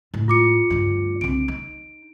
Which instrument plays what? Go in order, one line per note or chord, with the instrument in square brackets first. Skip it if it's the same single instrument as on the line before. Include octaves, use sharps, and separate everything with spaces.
[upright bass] A2 G#3
[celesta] F4 D6 C#7
[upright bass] D2 G2
[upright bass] C2 D4 [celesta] D7
[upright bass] D#4